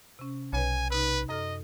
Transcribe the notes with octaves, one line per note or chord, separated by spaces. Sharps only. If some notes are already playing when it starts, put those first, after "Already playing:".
C3 C#4
B1 B4 C#5 G#5
C3 D#4 B4
F#2 A4 D#5 F6